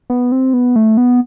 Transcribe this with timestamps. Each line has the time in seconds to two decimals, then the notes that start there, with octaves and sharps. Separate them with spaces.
0.10 B3
0.32 C4
0.54 B3
0.76 A3
0.97 B3